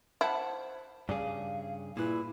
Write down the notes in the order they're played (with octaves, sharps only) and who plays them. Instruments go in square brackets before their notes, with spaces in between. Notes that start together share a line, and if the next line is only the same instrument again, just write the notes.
[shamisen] E4 [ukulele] C5 F#5 A5
[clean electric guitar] G2 C#3 G#4 [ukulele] D5 [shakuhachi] F5
[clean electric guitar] A#2 [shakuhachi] E4 [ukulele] G#4 B4